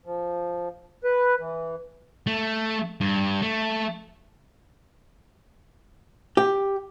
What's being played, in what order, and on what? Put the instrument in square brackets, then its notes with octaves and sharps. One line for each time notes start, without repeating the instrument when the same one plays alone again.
[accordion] F3
B4
E3
[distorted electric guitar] A3
G2
A3
[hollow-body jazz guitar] G4